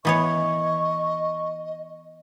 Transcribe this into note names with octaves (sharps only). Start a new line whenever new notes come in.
E3 B3 C#5 D#5 C#6